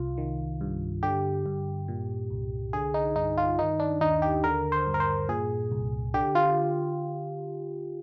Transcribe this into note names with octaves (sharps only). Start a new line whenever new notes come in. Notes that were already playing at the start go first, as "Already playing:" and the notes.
Already playing: C2 C3 F4
D#3
G2
D3 G4
G2
A#2
C2
D3 G#4
D#4
G2 D#4
F4
D#3 D#4
D4
D#2 D#4
G4
D3 A#4
C5
G2
A#4
C5
A#2 G#4
C2
D3 G4
F4